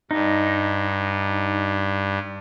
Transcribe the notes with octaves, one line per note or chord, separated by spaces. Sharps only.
G2 D#4